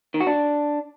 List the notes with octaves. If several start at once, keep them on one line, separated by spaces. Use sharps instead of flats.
D#3
F#4
D4